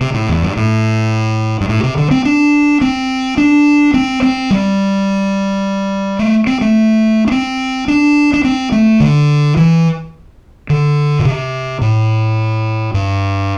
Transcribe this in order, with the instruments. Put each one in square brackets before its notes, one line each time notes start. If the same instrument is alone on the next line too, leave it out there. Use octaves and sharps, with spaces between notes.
[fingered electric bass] C3
A2
E2
G2
A2
G2
A2
C3
D3
C4
D4
C4
D4
C4
C4
G3
A3
C4
A3
D4
C4
D4
D4
C4
A3
D3
E3
D3
A2
C3
A2
G2